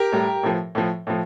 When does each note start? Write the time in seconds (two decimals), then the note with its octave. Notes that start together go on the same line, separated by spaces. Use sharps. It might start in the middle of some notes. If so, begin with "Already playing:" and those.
Already playing: G4 A#4
0.12 A2 G3
0.43 A2 F3
0.75 A2 F3
1.07 A2 F3